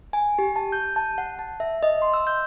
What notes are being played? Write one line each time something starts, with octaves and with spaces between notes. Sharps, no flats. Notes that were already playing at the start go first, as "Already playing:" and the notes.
G#5
G4
A5
G6
A5
F#5
A5
E5
D#5
C6
E6
G6